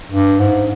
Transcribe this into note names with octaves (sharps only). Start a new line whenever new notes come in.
G2
G#2